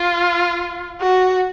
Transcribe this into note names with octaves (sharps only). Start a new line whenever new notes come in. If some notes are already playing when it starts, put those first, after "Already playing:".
Already playing: F4
F#4